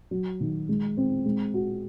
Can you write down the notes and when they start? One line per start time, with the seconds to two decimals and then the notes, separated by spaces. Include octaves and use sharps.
0.11 F#3
0.41 D#3
0.69 G#3
0.97 C4
1.26 G#3
1.54 F#4